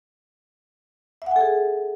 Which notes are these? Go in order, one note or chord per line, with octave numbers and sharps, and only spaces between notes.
G#4 A4 E5 F#5 G#5